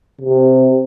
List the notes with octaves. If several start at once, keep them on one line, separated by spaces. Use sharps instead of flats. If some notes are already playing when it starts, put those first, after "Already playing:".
C3